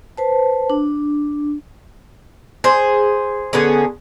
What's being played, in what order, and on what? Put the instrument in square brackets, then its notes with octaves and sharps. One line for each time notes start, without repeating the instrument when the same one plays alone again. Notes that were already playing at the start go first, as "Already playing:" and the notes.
[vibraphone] B4 C5 A5
D4
[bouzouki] G#4 C5
D3 B3 C#4 G#4